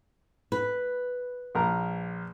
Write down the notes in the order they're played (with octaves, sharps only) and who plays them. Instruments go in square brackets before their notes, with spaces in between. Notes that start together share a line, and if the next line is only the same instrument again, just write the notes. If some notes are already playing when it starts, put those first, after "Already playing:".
[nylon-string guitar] B4
[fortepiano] A#1 A#4 A#5